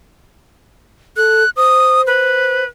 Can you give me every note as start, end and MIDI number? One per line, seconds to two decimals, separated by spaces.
1.17 1.43 69
1.17 1.50 90
1.57 2.64 72
1.57 2.02 87
2.07 2.67 71